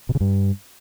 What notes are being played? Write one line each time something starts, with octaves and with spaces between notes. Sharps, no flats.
B2
C#3
G2